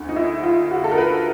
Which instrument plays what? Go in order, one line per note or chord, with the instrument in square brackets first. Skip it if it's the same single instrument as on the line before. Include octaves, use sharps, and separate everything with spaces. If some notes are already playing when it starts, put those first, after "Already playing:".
Already playing: [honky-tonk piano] D2 D3
D#4
E4
F4
F#4
A4
A#4
B4